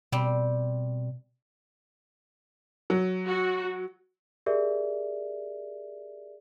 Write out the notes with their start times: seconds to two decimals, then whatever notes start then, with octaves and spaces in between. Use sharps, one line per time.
0.12 B2 G3 C4
2.90 F#3
3.27 F#4
4.46 G4 G#4 A#4 D5 E5